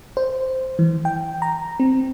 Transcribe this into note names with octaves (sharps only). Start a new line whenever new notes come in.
C5
E3
G5
A#5
C4